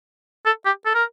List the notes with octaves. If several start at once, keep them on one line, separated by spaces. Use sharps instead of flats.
A4
G4
A4
A#4